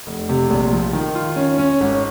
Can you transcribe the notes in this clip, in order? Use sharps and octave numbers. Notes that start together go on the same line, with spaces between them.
F1
C3
A#1
F3
D#3
F4
C#4
C#4
G#1